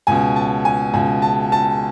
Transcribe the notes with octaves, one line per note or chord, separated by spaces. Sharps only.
C#2 B2 G#5
A5
G#5
C#2 B2 G#5
A5
A5